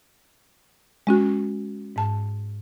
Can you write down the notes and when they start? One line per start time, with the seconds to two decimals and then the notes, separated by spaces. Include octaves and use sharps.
1.07 G#3 C#4 F#4
1.96 G#2 A5